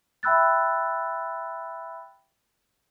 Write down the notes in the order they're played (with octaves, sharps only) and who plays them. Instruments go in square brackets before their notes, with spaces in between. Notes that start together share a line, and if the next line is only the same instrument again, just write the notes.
[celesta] E5 G5 B5 E6 F#6 A6